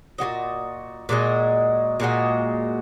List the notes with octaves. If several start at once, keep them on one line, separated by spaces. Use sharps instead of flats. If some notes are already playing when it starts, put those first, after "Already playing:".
A#2 G#3 F#4 D#5
A#2 G#3 F#4 D#5
A#2 G#3 F#4 D#5